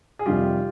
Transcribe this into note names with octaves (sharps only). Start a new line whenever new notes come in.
G#4
F2 C3 D#3 G3 F4 G4